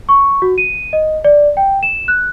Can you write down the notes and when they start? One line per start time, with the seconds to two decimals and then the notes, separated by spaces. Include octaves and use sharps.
0.09 C#6
0.42 F#4
0.58 D#7
0.93 D#5
1.24 D5
1.57 G5
1.83 E7
2.08 F#6